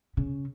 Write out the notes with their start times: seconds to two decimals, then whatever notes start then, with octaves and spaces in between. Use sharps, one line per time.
0.17 C#3